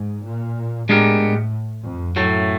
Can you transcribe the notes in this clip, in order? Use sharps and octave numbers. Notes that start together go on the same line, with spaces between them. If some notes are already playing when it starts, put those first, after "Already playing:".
Already playing: G#2
A#2
A2 G#3 B3 D4 G4 A#4
A2
F2
F#2 A2 F#3 A3